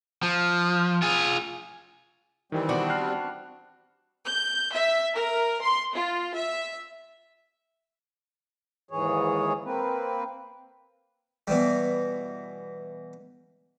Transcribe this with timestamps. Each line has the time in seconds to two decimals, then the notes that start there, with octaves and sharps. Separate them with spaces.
0.23 F3
1.02 F4 G#4
2.52 D#3 E3 G3 C4
2.69 B3 D4 F#4
2.90 F6 F#6 C7
4.25 G6
4.74 E5
5.14 A#4
5.62 C6
5.94 F4
6.35 E5
8.91 D#2 G#2 E3 G#4 C#5
9.64 A#3 C4 B4
11.47 B2 E3 G3